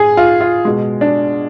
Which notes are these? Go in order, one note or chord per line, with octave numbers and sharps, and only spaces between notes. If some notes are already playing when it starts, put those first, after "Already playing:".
Already playing: A2 G#4
F4
F4
B2 G#3
D4